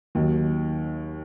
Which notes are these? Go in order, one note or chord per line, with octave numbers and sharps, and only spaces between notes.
D#2 D#3 F#3